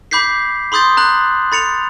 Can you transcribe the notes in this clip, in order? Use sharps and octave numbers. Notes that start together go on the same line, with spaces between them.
B5 D6 G6 B6 C7
B5 C6 D#6 G6 A6
A#5 F#6 F#7
B5 A6 C#7 F7